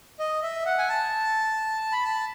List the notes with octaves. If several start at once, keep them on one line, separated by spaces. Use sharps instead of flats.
D#5
E5
F#5
G#5
A5
B5
A5